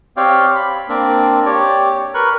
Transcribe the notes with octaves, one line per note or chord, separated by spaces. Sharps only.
C4 G4 C#5 D5 F5 G5
B5
A#3 C4 D4
G4 C#5 D5
A#4 B4 C#6 F#6